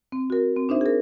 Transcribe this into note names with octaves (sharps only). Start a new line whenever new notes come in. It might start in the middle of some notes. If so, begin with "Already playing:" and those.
C4
F#4 A#4
C4
D4 D#4 C5 E5
G#4 A#4